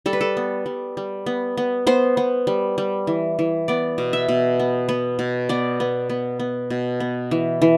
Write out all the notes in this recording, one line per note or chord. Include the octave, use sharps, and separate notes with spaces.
G3 A4
B4
A4
B3
G3
G3
B3
B3
B3 C5
B3
G3
G3
E3
E3
B3 D5
B2
E5
B2
B3
B3
B2
B3 D5
B3
B3
B3
B2
B3
E3
E3